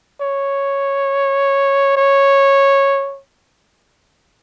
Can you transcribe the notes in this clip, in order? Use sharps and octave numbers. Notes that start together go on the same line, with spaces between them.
C#5
C#5